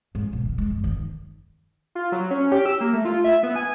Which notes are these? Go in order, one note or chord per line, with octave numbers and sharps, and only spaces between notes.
G#2
B2
D#3
G#3
G1
D#3
F4
F#3
C#4
G4
E6
A#3
A3
F4
E5
B3
G#5